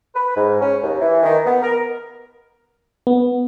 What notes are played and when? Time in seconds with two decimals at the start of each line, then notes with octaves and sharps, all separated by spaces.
0.15 B4
0.36 G#2
0.61 C#4
0.83 D#2
1.01 E3
1.23 D#3
1.46 B3
1.63 A#4
3.07 B3